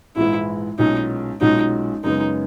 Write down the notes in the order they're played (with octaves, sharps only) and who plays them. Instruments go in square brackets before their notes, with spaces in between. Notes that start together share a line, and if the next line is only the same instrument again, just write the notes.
[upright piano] A#1 G#2 E3 G#3 [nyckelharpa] E4
[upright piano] B1 A#2 G#3 C#4 F#4 [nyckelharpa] D#4
[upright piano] B1 A#2 G#3 C#4 F#4 [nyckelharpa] D#4
[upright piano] F#2 C#3 G#3 B3 [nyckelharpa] D#4